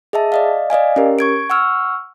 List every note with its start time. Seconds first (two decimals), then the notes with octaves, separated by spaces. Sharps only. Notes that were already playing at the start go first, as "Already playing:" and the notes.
0.13 G#4 D#5 E5 A5
0.32 D5 D#5 F5
0.70 D5 D#5 F5 G#5
0.96 C#4 G4 A#4
1.19 C#6 G#6 D7
1.50 F#5 C#6 E6 F6